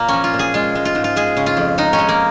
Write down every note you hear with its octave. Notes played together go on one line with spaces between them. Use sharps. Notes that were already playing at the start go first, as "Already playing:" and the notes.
Already playing: A#2 A#3
F3 C#4
F4
A#2
G#4
G#3 F4
G#3
F4
G#2
F4
G#3 G#4
C#3
F4
F2
G#3 D#4
C#4
G#3
A#3